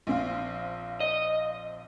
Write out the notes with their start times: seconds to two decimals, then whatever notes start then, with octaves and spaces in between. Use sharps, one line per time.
0.07 A#1 C4 F5
1.00 D#5